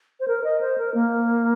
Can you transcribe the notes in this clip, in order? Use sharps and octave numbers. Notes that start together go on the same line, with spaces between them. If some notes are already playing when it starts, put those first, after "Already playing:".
C5
A#4
D#5
C5
A#4
A#3